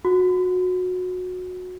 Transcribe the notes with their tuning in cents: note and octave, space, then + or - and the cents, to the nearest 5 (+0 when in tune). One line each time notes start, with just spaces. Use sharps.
F#4 -20